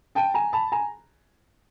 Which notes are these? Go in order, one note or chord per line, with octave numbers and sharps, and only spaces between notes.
G5 A5
G#5 A#5
A5 B5
G#5 A#5